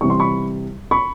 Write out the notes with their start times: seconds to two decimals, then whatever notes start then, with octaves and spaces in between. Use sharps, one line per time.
0.01 C3 E3 G3 C#6
0.10 C6
0.20 B5 C#6
0.91 B5 C#6